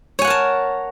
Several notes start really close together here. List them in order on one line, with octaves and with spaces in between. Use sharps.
C#5 G#5 F#5 A#4 A5